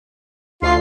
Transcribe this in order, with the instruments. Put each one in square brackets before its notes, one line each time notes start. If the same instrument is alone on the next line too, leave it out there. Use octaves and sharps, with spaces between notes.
[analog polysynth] D2 C7 [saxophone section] F4